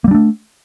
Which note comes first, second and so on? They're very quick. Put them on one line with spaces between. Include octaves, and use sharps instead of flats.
A#3 G3 D4 A3